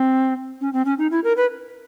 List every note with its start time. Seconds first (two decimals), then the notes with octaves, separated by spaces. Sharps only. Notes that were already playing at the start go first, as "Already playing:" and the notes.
Already playing: C4
0.61 C#4
0.73 C4
0.85 C#4
0.98 D#4
1.11 E4
1.24 A#4
1.37 B4